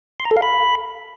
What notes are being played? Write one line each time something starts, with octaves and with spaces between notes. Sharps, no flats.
C6
A#5
A4
F5
B5